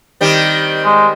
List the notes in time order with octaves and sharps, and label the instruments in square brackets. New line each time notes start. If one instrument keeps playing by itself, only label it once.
[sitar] D#3 G3 C4
[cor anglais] G#3